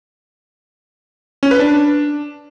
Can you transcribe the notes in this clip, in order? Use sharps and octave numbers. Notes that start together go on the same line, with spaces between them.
C#4
B4
D4